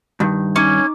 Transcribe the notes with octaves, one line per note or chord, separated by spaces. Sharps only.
G2 D#3
C#4 D#4 D6 G#6